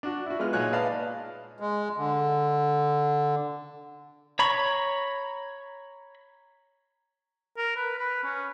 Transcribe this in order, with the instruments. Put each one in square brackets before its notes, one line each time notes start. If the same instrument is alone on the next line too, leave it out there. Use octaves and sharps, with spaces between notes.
[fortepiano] D4 F#4
E4 F#4
G#3 B3 F4 F6
A#2 D#4 G#4 C#5 F#6
B4 D5 D#5 F5 A5
[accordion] G#3
D3
[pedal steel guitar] C#5 A#5 B5 C#6
[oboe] A#4
B4
B4
C#4